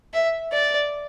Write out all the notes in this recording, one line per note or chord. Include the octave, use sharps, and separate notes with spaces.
E5
D5